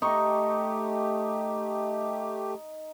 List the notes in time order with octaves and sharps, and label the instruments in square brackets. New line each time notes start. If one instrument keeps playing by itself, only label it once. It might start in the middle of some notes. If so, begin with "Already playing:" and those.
[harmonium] A3 G4 [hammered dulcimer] D#4 C#6